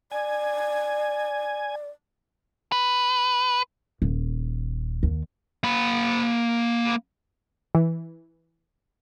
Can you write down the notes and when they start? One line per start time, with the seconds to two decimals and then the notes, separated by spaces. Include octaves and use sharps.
0.12 D5 G#5
2.72 B4
4.02 D#1
5.03 D#2
5.64 A#3 B5
7.75 E3